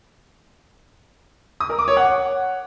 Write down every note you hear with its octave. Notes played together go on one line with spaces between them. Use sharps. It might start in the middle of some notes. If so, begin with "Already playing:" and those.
D#6
A#4
D6
C#5
F#5